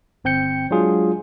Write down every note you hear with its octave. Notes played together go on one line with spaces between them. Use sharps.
G1 C4 G5 G6 C#7
F#3 G#3 D4 F4 G#4